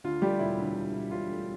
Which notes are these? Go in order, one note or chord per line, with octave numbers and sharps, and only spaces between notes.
D2 F4
G3 A3 G4
E1 E4
D2
D2
E1
E1 F4
A3